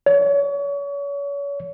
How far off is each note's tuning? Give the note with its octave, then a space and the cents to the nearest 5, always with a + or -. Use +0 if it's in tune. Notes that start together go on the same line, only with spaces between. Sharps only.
C#5 +35